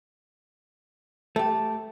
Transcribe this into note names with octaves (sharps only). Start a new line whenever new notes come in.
A3 G4 A5